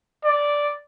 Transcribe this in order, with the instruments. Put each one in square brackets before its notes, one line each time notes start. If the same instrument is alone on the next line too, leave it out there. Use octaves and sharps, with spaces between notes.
[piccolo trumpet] D5